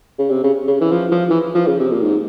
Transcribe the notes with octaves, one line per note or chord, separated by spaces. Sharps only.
C#3
C3
C#3
C#3
E3
F3
F3
E3
F3
C#3
C3
A#2
G#2